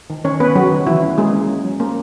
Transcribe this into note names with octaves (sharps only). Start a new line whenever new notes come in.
D#3
D#3 C#4 C#5
B3 C#4 B4
F#3 F#4
D#3
E3 F#3 E4
C#4
G#3 A#3 G#4
C#4
C#4
F#3
A#3 C#4 A#4